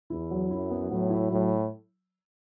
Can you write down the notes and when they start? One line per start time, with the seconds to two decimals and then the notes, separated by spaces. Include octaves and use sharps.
0.10 E2 E4
0.31 F#3
0.51 F#2 E4
0.71 B3
0.91 A2 F#3
1.10 E4
1.31 A2 F#3